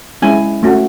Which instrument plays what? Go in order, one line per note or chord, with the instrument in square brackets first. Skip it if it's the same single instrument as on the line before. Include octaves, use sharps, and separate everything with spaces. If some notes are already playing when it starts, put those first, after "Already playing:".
[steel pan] G#3 C#4 E4 G#5
A3 C#4 F#4